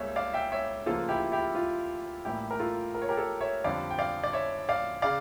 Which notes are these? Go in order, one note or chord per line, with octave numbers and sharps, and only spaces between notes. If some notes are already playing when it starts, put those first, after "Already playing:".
Already playing: C#2 C#3 G3 A#3 C#5 E5
D5 F5
E5 G5
C#5 E5
D2 C#3 F3 A#3 F4 A4
E4 G4
E4 G4
F4
A1 A2 G3 A#3 E4 G4
A#4
F4 A4
A#4
C#5
G4 A#4
A4 C#5
C#5 E5
F2 D3 G3 D5 F5
G5
D5 F5
D5
C#5 E5
D5 F5
C#3 D5 F5